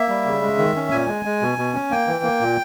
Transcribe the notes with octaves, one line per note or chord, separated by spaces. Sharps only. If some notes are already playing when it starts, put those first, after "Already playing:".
Already playing: A#3 E5
G3
C#3
G#3
D#3
C#4
A#2 G#5
G#3
G#3
B2
B2
C#4
A#3 G5
E3
A#3
A#2